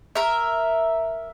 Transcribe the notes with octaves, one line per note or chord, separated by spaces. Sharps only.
A#4 E5